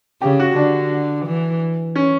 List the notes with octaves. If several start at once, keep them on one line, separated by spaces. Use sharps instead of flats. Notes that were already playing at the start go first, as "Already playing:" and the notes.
C#3 G4
F#4
D3 D4
E3
C#4